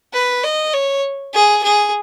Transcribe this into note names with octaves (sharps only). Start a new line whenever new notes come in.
B4
D#5
C#5
G#4
G#4